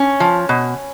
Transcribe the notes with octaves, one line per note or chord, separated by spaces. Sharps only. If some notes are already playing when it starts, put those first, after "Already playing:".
Already playing: C#4
F3
B2